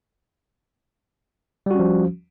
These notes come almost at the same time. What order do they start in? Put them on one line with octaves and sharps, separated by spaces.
G3 F#4 C#4 F3